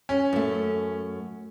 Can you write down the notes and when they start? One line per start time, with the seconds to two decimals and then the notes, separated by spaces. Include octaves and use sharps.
0.09 C#4
0.33 F#2 A3